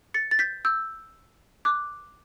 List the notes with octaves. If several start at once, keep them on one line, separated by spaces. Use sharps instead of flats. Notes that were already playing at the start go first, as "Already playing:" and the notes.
A6 C#7
A6
G6 B6
E6 G6
D6 F#6